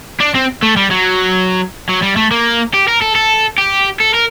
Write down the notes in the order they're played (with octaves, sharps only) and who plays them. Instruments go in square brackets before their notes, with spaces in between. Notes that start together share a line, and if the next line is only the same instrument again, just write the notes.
[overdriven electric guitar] D4
C4
A3
G3
F#3
F#3
G3
A3
A#3
G4
A#4
A4
A4
G4
A4
A#4